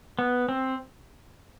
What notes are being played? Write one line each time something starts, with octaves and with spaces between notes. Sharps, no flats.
B3
C4